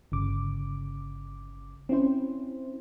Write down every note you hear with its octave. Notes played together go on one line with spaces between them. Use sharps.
G1 C#3 D6
C4 C#4 E4 C5